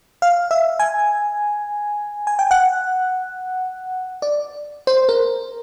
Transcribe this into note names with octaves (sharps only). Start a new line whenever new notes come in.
F5
E5
G#5
G#5
G5
F#5
D5
C5
A#4